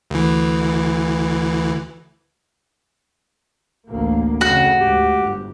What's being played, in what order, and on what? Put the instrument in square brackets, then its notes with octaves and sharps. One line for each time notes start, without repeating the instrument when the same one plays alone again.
[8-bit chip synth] D2 E3
[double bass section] A1 D2 A#3
[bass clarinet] F2 [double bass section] C#3 [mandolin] F#4
[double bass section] D2 G#2 [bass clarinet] G4
[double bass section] G1